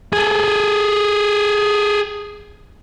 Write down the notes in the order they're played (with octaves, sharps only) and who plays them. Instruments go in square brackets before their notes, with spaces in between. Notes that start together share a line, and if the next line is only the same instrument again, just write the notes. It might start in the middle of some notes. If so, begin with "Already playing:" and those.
[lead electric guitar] G#4 A4